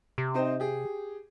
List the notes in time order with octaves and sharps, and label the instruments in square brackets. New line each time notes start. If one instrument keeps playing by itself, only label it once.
[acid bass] C3
[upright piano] C4 D#4 C5
G4 G#4